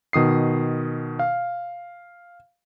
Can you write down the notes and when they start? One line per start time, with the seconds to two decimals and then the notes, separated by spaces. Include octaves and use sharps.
0.13 B2 D#3 D#6 C7
1.19 F5